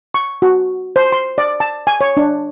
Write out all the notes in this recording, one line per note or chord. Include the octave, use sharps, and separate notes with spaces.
C#6
F#4
C5
C6
D5
A5
G#5
C#5
D4